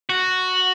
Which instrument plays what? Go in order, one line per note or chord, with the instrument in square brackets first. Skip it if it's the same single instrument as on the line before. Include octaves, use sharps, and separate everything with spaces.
[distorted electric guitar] F#4